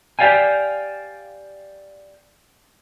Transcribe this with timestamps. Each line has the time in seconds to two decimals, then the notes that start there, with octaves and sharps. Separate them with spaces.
0.19 G4 C5 D5 F5 G5 G#5